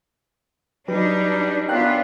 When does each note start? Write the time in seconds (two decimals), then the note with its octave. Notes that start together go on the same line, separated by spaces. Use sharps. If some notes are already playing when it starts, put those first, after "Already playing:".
0.88 F#3 G3 D4 D#4 B4
1.69 F#2 B3 D4 F4 G5 F#6